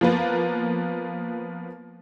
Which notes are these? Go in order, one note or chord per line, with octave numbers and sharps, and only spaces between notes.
F3 A#3 B3 B4